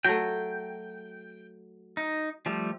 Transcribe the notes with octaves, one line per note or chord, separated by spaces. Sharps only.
F#3 A3 G5
D#4
F3 G3 A3